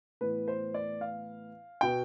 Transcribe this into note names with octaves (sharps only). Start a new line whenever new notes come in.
A2 E3 B3 B4
C5
D5
F5
B2 B3 G5